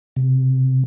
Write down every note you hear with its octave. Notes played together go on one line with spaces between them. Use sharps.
C3